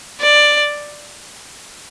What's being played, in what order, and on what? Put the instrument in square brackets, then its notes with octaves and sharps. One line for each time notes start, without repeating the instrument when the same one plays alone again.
[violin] D5